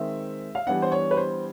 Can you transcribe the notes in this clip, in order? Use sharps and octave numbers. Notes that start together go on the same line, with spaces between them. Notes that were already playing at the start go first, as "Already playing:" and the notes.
Already playing: D#3 G#3 C4 E5
F5
E3 G3 B3 D4 F#5
C5
C#5
B4
C5